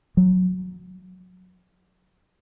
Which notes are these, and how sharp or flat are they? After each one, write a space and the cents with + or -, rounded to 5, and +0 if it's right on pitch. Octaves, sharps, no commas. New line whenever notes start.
F#3 -15